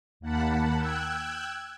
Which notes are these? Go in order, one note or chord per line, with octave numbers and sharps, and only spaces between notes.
D#2 A#3 F#5 A5 B5
G5 E6 F#6 G#6